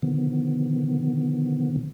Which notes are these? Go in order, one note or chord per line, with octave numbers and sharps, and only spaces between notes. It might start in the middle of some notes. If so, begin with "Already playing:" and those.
B2 D3 D#3 F3 B3